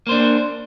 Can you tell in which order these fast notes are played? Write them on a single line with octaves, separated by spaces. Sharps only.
A#3 C5 D4